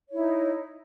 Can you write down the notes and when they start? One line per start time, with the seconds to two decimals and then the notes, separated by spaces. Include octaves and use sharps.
0.09 C#5
0.12 E4
0.15 D#4